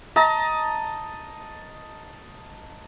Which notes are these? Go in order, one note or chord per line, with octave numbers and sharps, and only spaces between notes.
D#5 A5 A#5